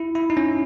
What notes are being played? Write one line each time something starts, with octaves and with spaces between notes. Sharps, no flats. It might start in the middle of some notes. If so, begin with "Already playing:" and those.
Already playing: E4
E4
D#4
C#4